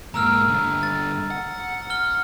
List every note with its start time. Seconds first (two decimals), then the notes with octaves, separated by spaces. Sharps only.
0.14 G#2 A#3 A#5 E6 F6
0.48 G2 D3
0.83 A6
1.31 F#5
1.90 F6 G7